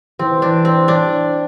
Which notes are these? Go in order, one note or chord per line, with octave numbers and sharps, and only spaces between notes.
E3 C4
D4
C4
D4